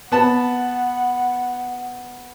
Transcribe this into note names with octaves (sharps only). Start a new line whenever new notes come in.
B3 F#5 A5